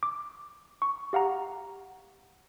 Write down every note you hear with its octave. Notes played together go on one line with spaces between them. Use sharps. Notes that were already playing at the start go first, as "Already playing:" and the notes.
D6
C#6
G4 F5 F#5 A#5